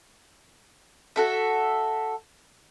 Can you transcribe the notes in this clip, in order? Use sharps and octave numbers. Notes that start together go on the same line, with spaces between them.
F#4 A4 E5